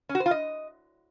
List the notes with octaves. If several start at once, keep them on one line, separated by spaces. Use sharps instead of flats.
C#4
F#4
C5
F4
D#5